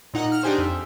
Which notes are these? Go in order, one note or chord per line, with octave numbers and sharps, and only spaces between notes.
A#2 D#4 F#5
F6
D4 D#4 G4 G#4 C5
F2 E5